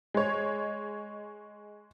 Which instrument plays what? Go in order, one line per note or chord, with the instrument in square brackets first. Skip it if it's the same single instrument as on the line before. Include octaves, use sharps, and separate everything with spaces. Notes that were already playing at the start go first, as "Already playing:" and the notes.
[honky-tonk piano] G#3 C#5